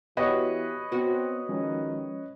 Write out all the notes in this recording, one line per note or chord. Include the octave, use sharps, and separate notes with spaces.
E3 B3 F#4 G4 B4 C#5 D#5
B3 C4 F#4
D#3 F3 G#3 C#4